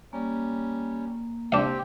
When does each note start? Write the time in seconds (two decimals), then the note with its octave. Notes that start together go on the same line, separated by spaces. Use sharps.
0.13 G3 A#3 C#4
1.52 C4 D4 G4 F5 G5